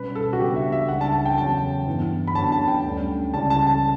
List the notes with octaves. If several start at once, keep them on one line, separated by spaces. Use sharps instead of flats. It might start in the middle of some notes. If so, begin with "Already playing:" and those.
Already playing: B2 G3 C#4 B4
A4
F#4
C#3 G3 B3 D4 G4
E5
E5
C#2 C#3 G3 D4 F#5
A5
A5
G5
E2 C#3 F#3 A5
G2 E3 B3 E4
B5
F#2 D3 F#3 B3 D4 A5
A5
G5
D2 D3 G3 C#4
C#2 C#3 G3 C#4 E4 A5
A5
A5